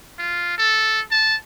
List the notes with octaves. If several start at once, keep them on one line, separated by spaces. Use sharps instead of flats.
F4
A4
A5